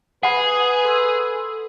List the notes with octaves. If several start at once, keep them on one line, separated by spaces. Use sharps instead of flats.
G#4 B4 F#5 B5
A4 C6 E6